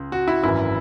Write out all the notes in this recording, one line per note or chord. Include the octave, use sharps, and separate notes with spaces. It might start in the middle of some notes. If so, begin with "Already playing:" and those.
Already playing: C#2 C#3
F#4
E4
G#1 F#2 E3 E4